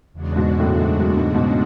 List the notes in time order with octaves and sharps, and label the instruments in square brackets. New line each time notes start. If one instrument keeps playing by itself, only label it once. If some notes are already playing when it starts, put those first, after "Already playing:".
[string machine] E2 C#3 G#3 D4 F#4
[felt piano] G#2 B2
F#2 A2
A2
G#2
F#2
G#2
G#2 B2